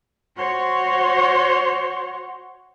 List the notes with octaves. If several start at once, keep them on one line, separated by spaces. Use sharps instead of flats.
F#4 C5 C#5 F#5 C6